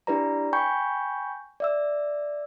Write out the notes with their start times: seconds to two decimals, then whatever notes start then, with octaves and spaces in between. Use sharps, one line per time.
0.07 D4 E4 G4 B4 D5 A#5
0.53 G5 G#5 B5 C#6 G6
1.60 D5 E5 E6